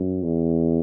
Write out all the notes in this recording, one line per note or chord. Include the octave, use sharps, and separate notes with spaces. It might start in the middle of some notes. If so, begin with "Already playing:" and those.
Already playing: F#2
E2